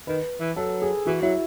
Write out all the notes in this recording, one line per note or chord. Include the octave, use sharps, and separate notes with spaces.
D#3 B4
E3
F#3 A4
G#4
E3 F#4
F#3 E4